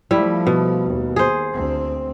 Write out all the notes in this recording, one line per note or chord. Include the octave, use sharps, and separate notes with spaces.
F3 G3 A3 E4
B2
D#2
G#4 C5
D2 C4